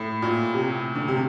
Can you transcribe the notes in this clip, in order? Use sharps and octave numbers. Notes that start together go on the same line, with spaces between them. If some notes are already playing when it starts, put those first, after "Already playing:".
Already playing: A2
A#2
C3
D3
C3